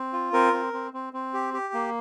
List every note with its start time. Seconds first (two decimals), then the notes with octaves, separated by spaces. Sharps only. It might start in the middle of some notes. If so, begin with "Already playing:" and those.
Already playing: C4
0.13 F4
0.33 C4 A#4
0.53 C4
0.73 C4
0.93 C4
1.13 C4
1.34 G4
1.54 G4
1.74 A#3